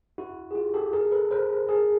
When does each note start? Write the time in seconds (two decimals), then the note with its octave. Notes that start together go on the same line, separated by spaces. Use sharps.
0.18 E4 F#4
0.51 G#4
0.55 F4 G4
0.74 G4 A4
0.93 G#4 A#4
1.05 A#4
1.12 A4 B4
1.31 A#4 C5
1.68 G#4 A#4